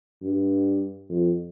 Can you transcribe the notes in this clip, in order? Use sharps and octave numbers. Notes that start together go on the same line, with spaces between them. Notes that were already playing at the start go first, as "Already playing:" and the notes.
G2
F2